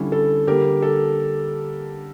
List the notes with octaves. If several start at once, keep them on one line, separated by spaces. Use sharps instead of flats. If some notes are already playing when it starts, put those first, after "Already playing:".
Already playing: D3 G3 C#4 E4
A4
D3 G3 A#3 G4 A#4
A4